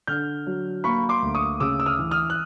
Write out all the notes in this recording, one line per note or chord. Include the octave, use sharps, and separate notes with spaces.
D3 F6 G6
F#3
A#3 B5 C#6
C6 D6
D2
C#6 D#6
C#3 D6 E6
E6
D#6 F6
E3
D#6 F6
F#6